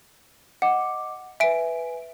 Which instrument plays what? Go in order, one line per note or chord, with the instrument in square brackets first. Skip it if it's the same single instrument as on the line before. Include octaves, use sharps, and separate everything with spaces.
[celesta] D#5 D6 [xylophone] F#5
[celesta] B4 G#5 [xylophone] E5 D7